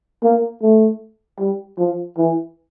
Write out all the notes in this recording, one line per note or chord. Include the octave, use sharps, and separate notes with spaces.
A#3
A3
G3
F3
E3